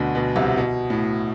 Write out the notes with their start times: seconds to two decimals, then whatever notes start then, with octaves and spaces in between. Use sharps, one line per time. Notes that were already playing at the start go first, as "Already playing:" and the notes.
Already playing: D2 B2 D3
0.15 B2
0.36 C2 C3
0.57 B2
0.90 A2